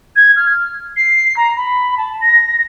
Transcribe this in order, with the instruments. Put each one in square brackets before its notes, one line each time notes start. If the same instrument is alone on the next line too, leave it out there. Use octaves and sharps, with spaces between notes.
[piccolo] G#6
F6
C7
A#5
B5
A5
A#6